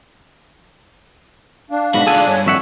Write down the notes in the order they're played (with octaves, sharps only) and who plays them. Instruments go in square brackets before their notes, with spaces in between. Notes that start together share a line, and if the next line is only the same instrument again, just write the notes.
[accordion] D4 [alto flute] F5
[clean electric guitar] G#2 B2 [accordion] D4 B5 [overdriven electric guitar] F#4
[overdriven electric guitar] D3 F4 [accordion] D4 [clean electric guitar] G#4 A4 G#5
[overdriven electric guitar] G2 [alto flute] C#5
[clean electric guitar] F2 E5 F#5 [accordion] A2 D#3 [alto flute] C#6